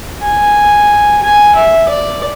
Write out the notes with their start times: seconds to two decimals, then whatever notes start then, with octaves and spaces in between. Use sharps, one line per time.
0.22 G#5
1.22 G#5
1.56 E5
1.89 D5